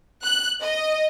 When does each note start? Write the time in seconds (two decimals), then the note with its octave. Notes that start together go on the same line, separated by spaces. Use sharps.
0.22 F#6
0.62 D#5